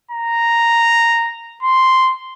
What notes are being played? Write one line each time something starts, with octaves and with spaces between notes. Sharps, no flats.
A#5
C6